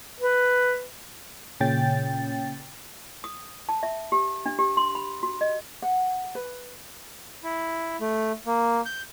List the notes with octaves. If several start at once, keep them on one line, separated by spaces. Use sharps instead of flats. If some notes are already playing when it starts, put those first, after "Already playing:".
B4
A#2 C#3 C#4 G5 A6
D#6
A5
E5
G4
D4
G4
C6
B5
F#4
D#5
F#5
B4
E4
A3
A#3
G6